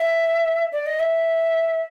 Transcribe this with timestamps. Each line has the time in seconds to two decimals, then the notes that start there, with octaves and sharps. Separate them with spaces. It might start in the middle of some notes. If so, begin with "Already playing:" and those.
Already playing: E5
0.72 D5
0.86 D#5
1.00 E5